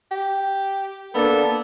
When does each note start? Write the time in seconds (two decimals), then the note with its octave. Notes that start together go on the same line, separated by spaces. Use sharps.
0.11 G4
1.14 A#3 B3 D4 A4